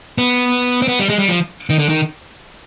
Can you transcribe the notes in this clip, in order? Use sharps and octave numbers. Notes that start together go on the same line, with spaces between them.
B3
C4
B3
G3
G#3
G3
F3
D#3
D3
D#3